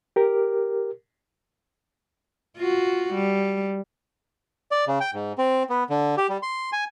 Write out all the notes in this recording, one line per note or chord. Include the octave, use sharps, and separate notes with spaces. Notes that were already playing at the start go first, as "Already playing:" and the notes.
G4 A#4
F4 F#4
G3
D5
C#3
G5
G#2
C4
B3
D3
G4
G3
C6
G#5